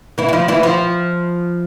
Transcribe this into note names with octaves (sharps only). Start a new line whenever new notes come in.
E3 E4
E4
F3 F4
E3 E4
F3 F4